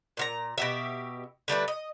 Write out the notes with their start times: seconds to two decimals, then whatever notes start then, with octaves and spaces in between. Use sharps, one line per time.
0.17 A#2 F4 A#5
0.58 B2 G4 E5
1.48 D3 G3 A3 B4
1.68 D#5